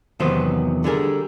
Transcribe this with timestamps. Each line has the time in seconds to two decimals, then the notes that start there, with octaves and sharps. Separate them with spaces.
0.20 E2 C3 D#3 F#3 B3 C5
0.84 D3 G3 G#4 A#4